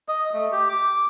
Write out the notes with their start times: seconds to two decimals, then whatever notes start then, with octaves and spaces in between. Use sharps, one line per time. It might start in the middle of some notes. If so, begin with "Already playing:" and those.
0.08 D#5
0.33 A3
0.52 G4
0.69 D6